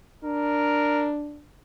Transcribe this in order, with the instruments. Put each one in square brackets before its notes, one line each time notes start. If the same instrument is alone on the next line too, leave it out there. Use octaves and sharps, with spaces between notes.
[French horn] D4 [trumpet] A#4